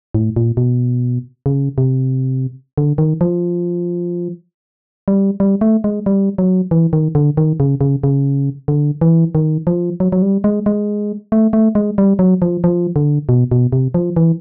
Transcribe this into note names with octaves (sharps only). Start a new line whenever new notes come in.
A2
A#2
B2
C#3
C3
D3
D#3
F3
G3
G3
A3
G#3
G3
F#3
E3
D#3
D3
D#3
C#3
C#3
C#3
D3
E3
D#3
F3
F#3
F#3
G3
G#3
G#3
A3
A3
G#3
G3
F#3
F3
F3
D3
B2
B2
C3
F3
E3